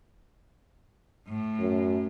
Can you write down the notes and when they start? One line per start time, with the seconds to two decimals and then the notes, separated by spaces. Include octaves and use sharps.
1.27 A2
1.59 F#2